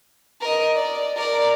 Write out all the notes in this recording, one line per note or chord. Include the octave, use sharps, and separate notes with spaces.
A#4 D#5
D5
A#4 D5